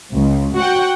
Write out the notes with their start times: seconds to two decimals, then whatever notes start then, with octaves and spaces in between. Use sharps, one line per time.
0.14 C#2
0.58 F#4 F#5 G5